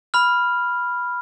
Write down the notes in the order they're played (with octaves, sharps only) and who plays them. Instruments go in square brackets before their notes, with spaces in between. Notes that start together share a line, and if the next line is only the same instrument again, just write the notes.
[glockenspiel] B5 F6